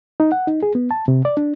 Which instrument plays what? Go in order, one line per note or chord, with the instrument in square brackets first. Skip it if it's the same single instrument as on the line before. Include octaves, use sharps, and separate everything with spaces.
[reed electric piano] D#4
F#5
D#4
G#4
B3
A5
C3
D5
D4